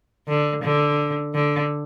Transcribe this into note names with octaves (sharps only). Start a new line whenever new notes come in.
D3
D3
D3